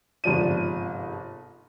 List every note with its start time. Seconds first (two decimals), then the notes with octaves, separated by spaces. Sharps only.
0.24 G1 G#2 C3 F3 D5 D#7